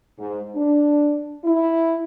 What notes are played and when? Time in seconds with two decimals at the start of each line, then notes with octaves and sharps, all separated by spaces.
0.18 G#2
0.55 D4
1.44 E4